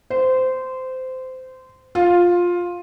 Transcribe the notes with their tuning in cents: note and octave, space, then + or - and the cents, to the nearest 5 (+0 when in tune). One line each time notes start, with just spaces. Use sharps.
C5 -20
F4 +10